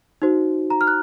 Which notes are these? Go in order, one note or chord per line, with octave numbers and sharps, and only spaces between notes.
D#4 F#4 C5
A#5
F6
F#6